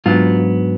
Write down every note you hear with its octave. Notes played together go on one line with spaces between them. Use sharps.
G#2 F#3 B3 D4 F4